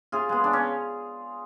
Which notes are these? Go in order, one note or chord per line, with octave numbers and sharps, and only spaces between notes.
C#3 F4 G#4
G#3 B3
C#3 D4
C#4